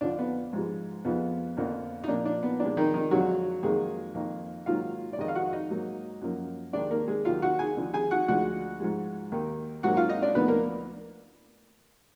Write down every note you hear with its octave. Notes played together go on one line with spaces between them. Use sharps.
F2 D3 F3 D4
B3
G#2 F3 G#3
F2 F3 G#3 B3
F2 D3 F3 A#3
D#4
A#2 F3 A#3 D4
D4
B3
A#2 F3 G#3 D4
D#3 D#4
D#3 D#4
F2 D3 F#3 G#3 F#4
F2 D#3 F#3 G#3 A#3 G#4
F2 D#3 A#3
G#2 D#3 F#3 A#3 F4 F5
D5
F2 D#3 G#3 D#5
F5
F#4 F#5
D#4 D#5
G#2 F#3 A#3
F#2 F3 A#3
D#2 D#3 G#3 D4 D5
A#3 A#4
G#3 G#4
D#2 D#3 F#3 F4 F5
F#4 F#5
G#4 G#5
D#2 D3 F3 G#3
G#4 G#5
F#4 F#5
D2 D3 F3 G#3 F#4 F#5
G#2 F3 G#3
D#2 D#3 A#3
G#2 F#3 A#3 F#4 F#5
F4 F5
D#4 D#5
D4 D5
D2 D3 F3 A#3 B3 B4
A#3 A#4